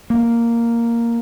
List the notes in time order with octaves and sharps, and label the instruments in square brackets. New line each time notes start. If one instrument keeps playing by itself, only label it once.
[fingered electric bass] A#3